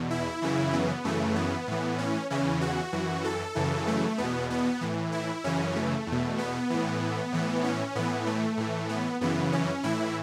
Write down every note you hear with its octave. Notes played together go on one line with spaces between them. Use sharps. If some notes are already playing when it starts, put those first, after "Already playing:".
Already playing: E2 B2
E4
F#2 C#3 E3
B3
F#2 C#3 E3 A3
B3
A2 E3
C#4
E2 C#3 E3 C#4
F#4
F#2 E3
A4
F#2 C#3 E3
A3
E2 B2 B3
B3
A2 E3
E4
F#2 C#3 E3 C#4
A3
E2
B2
B3
A2 E3
A2 E3
C#4
A2 E3 B3
A3
A2 E3
B3
F#2 C#3 E3 B3
C#4
A2 E3 E4